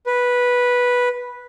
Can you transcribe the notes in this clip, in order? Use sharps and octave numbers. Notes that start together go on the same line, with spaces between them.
B4